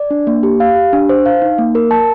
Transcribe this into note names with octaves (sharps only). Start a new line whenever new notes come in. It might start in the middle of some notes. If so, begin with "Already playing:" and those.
Already playing: D5
D4
A#3
G4
F5
G4
D4
C5
F5
D#4
A#3
A#4
A5